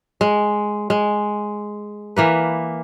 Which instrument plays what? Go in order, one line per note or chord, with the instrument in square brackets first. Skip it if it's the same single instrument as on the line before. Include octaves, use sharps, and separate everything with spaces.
[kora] G#3
G#3
E3 A#3 B4